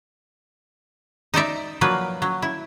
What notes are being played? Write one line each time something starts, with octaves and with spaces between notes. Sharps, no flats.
D#4 C5 D5 E5
F3 F#3 A#3 B4
F#3
E4